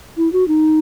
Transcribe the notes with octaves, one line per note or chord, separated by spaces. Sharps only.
E4
F#4
D#4